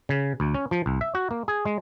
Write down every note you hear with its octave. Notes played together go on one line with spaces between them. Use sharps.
C#3
D2
C#4
F3
C2
E5
F#4
A#3
G#4
G#3